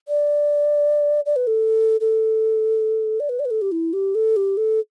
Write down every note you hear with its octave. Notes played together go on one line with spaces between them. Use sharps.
D5
D5
B4
A4
A4
D5
B4
D5
B4
A4
G4
E4
G4
A4
G4
A4